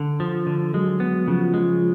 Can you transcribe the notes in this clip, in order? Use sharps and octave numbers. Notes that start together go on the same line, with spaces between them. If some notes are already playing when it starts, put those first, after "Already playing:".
Already playing: D3
F3
D3
F#3 G#3
B3
C#3 F3
G#3